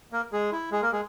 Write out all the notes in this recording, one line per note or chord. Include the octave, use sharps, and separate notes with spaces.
A#3 A#4
G#3 G#4
E4
G#3 G#4
A#3 A#4
G#3 G#4